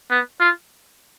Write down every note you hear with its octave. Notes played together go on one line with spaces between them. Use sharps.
B3
F4